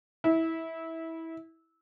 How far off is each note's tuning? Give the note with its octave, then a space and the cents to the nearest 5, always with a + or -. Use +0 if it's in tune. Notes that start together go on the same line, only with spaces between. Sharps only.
E4 -20